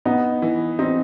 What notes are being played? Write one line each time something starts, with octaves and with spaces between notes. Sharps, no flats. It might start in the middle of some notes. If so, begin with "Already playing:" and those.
B3 D#4
E3
C4 D#4